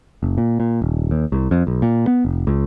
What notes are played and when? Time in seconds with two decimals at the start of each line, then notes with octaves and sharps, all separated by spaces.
0.23 F#1
0.38 A#2
0.60 A#2
0.82 D#1
1.11 D#2
1.32 C2
1.51 F2
1.67 B1
1.82 A#2
2.07 B3
2.25 F1
2.47 C#2